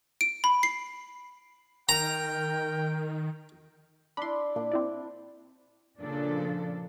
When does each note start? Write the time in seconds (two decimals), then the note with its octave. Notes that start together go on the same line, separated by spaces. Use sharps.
0.21 D7
0.44 B5
0.63 C7
1.89 D#3 A#4 G5 A#5
4.17 D4 E4 B5 C6
4.56 A#2 D4
4.72 C4 E4 D5
5.99 A#2 C#3 F3 D4 A4